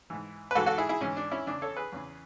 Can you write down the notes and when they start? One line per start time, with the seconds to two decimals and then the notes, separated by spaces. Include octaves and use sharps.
0.10 G#2 E3
0.51 B4
0.55 G#2 E3 F#4 A4
0.66 F#4 A4
0.78 E4 G#4
0.89 E4 G#4
1.01 G#2 E3 C#4
1.17 D4
1.31 C#4 E4
1.47 E2 C#3 E3 D4
1.62 A4 C#5
1.77 G#4 B4
1.92 E2 C#3 E3